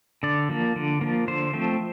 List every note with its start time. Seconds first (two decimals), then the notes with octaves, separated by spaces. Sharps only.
0.23 D3 D5
0.49 F3 A#3
0.76 D3
1.01 F3 A#3
1.28 D3 C5
1.53 F3 A3 C4